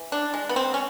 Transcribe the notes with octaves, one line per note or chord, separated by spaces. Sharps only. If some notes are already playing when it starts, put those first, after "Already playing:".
Already playing: E3
D4
G#3
B3
C4
C#4